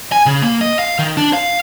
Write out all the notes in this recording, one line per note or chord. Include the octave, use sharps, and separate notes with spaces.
G#5
C#3
A#3
D#5
F5
D#3
D4
F5